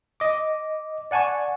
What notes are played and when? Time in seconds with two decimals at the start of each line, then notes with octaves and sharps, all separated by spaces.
0.20 D#5 D6
1.11 D5 F#5 G#5 A5 C#6